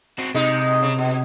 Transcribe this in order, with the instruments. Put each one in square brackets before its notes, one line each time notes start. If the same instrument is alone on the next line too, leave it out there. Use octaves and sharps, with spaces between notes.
[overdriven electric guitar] C4 F#4
[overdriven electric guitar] C3 [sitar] G#3 D#4
[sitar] C#3
B2